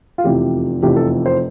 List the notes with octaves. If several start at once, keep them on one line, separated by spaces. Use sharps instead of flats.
F4
F1 E2 C3 F3 G4
F1 E2 C3 F3 G4
A4
C5